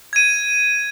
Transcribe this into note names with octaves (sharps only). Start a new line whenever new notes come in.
G#6 D#7